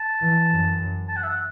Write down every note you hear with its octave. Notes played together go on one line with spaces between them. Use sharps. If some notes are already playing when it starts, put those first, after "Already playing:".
Already playing: A5
E3
F#2
A5
F#5
E5
F#5